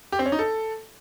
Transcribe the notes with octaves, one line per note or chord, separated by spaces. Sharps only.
G4
C4
C#4
D#4
A4